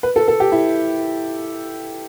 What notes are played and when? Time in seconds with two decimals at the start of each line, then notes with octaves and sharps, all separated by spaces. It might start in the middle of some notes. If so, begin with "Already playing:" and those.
0.03 B4
0.16 A4
0.28 A4
0.40 G4
0.52 E4